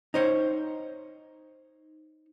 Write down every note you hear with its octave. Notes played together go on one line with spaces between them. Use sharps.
D#4 C5 C#5